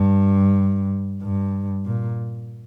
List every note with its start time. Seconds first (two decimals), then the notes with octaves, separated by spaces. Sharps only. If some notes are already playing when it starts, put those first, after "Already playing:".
Already playing: G2
1.22 G2
1.85 A#2